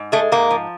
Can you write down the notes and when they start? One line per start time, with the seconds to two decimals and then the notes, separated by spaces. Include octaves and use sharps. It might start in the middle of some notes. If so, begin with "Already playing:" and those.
Already playing: G#2
0.12 G#3 A3
0.32 G#2 A#3
0.51 F3